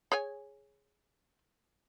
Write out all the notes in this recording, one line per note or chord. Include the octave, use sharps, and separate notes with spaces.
G#4 C#5 G#5